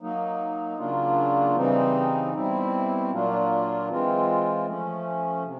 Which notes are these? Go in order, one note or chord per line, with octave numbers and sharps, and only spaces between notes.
F#3 A#3 D#4
C#3 F#3 A#3 D4 F4
C#3 E3 G3 C4 D#4
B2 G3 C4 E4
A#2 F#3 A#3 D4 F4
E3 G#3 C4 F4
F3 A3 C#4
C3